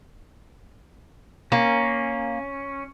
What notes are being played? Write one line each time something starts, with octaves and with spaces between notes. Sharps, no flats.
A#3 C#4